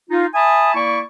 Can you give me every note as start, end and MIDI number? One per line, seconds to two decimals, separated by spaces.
0.10 0.26 63
0.10 0.26 65
0.34 0.74 76
0.34 0.74 80
0.34 0.74 81
0.34 0.74 83
0.34 0.74 87
0.75 1.00 58
0.75 1.00 64
0.75 1.00 74
0.75 1.00 85